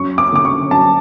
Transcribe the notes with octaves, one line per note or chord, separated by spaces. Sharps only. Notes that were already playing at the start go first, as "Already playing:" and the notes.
Already playing: F#2 C#6
D6
D3 D6
C#6
F#2 A5